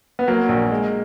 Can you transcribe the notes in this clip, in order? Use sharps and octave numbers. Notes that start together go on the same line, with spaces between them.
B3
F#3 A#3
A#1
G#3